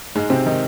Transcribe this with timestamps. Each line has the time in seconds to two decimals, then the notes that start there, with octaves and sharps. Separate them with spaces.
0.15 G#2 G#3
0.30 C3 C4
0.46 D#3 D#4